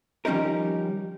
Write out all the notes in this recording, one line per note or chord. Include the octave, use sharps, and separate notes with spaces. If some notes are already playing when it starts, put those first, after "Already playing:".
D#3 F3 G3 C#4 D#4 A#4